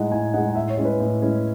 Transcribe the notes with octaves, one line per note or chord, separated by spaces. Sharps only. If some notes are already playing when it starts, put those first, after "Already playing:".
Already playing: A2 G#3 D#4 F#5
A2 G#5
G#3 D#4 F#5
F#5
A2 E5
C#5
G#3 C#4 E4
B4
A2
G#3 C#4 E4